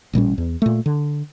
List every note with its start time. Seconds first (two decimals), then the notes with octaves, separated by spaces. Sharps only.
0.13 A1 A#2 G3 C#4
0.38 E2
0.62 A#2 A3
0.86 D3